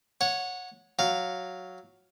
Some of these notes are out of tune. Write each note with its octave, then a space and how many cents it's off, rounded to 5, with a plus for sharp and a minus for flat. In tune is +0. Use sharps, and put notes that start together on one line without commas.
C#5 +0 F#5 -20
F#3 +0 F5 +0